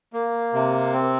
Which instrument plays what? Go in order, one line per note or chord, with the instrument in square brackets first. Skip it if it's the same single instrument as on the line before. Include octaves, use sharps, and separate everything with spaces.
[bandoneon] A#3
C3
C4